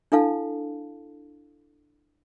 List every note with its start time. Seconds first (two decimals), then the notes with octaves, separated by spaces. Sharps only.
0.12 D4 E4 A4 F5 A5